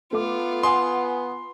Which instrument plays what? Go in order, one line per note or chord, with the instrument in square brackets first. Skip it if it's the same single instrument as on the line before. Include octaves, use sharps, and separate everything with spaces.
[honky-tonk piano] A3 D6 [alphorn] B3 [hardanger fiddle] F4
[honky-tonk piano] F#5 G#5 D#6 [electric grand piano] C6